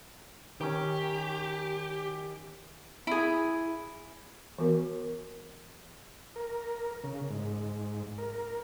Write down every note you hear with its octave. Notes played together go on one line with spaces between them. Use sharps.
D#3 C#4 G4
E4 G#4
E3 B3 F#4 A#4
A#4
C#3
G#2
A#4